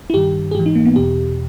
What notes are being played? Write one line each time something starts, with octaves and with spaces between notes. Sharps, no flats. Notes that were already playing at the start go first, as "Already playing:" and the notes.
E4
G2 D#3 G4
G#4
G#2 E3 G4
D#4
A#3
B3
E2 B2 G4